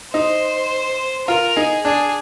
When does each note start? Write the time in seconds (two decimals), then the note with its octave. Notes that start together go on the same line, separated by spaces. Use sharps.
0.14 D#4 C5
1.27 F4 A#4
1.56 D#4 G#4
1.85 D4 G#4